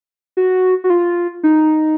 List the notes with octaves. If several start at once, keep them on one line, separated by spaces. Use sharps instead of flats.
F#4
F#4
F4
D#4